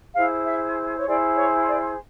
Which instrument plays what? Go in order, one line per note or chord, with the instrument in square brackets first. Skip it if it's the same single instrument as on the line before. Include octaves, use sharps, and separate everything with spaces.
[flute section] E4 G#4 C5 F5
E5
C#5
E4 G#4 C5 D5
C#5
D5